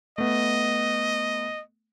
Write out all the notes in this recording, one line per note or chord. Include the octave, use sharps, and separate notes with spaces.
A3 B3 D#5